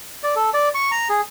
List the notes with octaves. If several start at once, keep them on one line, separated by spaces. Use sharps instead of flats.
D5
A4
D5
C#6
A#5
G#4